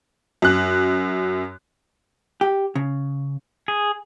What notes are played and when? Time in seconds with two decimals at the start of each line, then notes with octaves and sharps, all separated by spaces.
0.42 F#2 F#6
2.41 G4
2.75 C#3
3.68 G#4